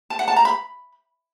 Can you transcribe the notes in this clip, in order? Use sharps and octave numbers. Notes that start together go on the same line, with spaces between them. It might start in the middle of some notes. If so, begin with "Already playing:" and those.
A5
F#5
A5
A#5
B5